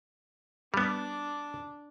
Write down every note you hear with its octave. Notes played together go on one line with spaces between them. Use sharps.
G3 B3 D4 D6